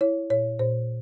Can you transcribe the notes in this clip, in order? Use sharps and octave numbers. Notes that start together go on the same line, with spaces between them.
E4 C#5
A#2 C#5
A#2 C5